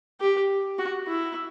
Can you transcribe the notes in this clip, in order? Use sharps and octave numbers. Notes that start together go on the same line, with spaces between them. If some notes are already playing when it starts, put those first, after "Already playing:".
G4
F#4
E4